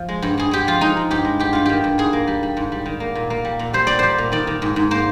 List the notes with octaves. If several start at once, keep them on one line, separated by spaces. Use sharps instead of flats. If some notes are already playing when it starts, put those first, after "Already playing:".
Already playing: F3
G#3
G2
G2 G#4
G#3 G4
F3 F4
G#3 D#4
G#3
G2 G4
G#3
G2 G4
G2 F4
D#3 G4
G2
G#2 G#4
A#3
G3
G3
G#2
G3
D#3
A#3
A#2
A#3
G3
A#2
G3 C5
A#2 D5
G3 C5
A#2
D#3 D5
D#3
G#2
G#2
A#3 C5